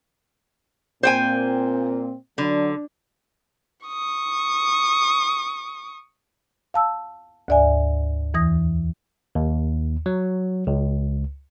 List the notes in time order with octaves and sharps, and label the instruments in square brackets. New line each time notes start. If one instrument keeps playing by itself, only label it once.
[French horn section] A#2 C4 [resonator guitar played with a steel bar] C5 G5 G#5
[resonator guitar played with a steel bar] D3 [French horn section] F#3 D4
[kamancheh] C#6 D#6
[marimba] F5 A5 E6
D2 G#2 D5 E5 G#5
E2 E3 D#6 A#6
[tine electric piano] D#2
F#3
C#2